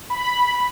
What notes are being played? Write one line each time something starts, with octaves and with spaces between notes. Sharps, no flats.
B5